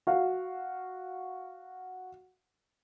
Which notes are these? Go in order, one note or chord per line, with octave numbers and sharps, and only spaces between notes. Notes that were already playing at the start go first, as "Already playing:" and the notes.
F#4 F5